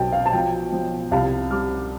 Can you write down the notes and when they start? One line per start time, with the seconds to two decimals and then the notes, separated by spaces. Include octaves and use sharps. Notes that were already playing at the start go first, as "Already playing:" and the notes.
Already playing: B1 B2 G5 A5
0.12 F5
0.26 A5
0.32 F3 G5
0.72 F3
1.11 C2 F5 A5
1.51 G3 D6 F6